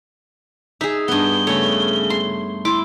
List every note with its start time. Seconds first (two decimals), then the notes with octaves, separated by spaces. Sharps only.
0.81 D#4 G#4 E5
1.08 G2 B3 G7
1.47 C#3 A3 C#5
2.10 C6
2.65 E4 C6 D6